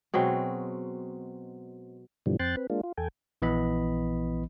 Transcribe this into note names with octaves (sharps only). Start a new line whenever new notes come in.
B2 F#3 G#3 C4
G2 B2 D3 E3 F3 G3
F2 C4 G5 C6 F#6 A6
C4 B4
G#3 A#3 D4 F4
F4
E2 A4 G5 G#5
A#1 E3 B3 D#5 B5